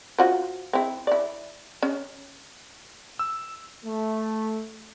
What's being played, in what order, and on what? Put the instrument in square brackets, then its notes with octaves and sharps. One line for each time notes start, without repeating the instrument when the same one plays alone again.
[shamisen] F4 F#4 C5
C4 E4
E4 D5
C#4
[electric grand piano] E6
[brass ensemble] A3